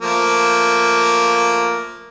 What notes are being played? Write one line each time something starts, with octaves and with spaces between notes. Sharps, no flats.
F3 A3 A#3